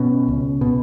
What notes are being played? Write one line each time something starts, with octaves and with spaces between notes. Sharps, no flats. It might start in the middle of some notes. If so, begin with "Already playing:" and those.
Already playing: B2 C#4
C#2
B2